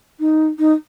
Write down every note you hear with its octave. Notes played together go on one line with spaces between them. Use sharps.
D#4
D#4